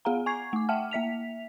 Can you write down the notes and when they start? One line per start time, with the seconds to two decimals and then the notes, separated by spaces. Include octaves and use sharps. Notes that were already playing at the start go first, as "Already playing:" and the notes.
0.05 B3 G#4 F5 F#5 A#5
0.26 G#5 C#6 G#6 C7
0.53 A3 D6
0.69 E5 F#5 G5 A5 F6
0.91 A#3 E5 B6 F7